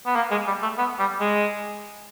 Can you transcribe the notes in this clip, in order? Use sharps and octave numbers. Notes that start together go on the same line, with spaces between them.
B3
A#3
G#3
G3
A3
B3
G3
G#3